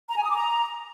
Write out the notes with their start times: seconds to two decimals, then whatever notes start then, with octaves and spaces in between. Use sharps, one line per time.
0.11 A#5
0.17 G#5
0.24 D#6
0.30 D6
0.36 A#5